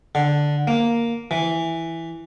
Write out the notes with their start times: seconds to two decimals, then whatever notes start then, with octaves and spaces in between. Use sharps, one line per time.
0.15 D3
0.67 A#3
1.31 E3